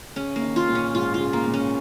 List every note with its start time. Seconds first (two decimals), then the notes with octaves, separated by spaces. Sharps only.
0.16 C#3 C#4
0.36 A#3
0.42 D#3
0.56 F4
0.69 A#2
0.75 C#4
0.95 G#2 F4
1.14 F4
1.21 C#3
1.33 A#3
1.47 A#2
1.54 C#4